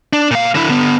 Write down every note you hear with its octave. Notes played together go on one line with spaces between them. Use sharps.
D4
A#2 F5
D3 E4
D3 B3